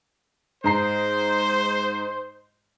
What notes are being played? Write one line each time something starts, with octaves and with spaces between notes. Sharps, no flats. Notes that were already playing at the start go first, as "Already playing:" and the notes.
G#2 C5 A#5 C7